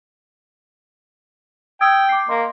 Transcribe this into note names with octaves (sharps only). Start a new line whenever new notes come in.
G5 D#6 E6 G#6
D6 C7
A#3 D#5 C6